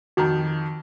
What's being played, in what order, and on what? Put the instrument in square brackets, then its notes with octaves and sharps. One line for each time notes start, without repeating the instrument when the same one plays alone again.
[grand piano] F2 D#3 [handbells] F#4 A#5